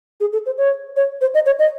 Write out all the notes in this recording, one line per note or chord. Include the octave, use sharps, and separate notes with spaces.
G#4
A4
C5
C#5
C#5
C5
D#5
C#5
D#5